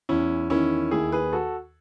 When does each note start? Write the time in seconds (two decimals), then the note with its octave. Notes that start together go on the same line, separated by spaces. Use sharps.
0.09 E2 C#4 E4
0.50 D#3 C#4 E4
0.91 D#2 E4 G#4
1.12 G#4 B4
1.33 F#4 A4